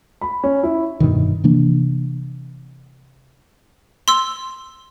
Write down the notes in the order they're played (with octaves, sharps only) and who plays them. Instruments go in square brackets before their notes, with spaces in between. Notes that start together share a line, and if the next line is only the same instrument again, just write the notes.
[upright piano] B5
C#4
E4
[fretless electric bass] F1 G2 B2 D#3
C3 E3 A#3 D4
[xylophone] C6 E6